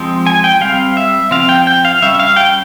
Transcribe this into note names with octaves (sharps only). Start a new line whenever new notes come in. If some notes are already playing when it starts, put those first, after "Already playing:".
Already playing: F3 G#3 C4
G#5
G5
G3 C4 F5
E5
F3 C4 F5
G5
G5
F5
G3 C#4 E5
F5
G5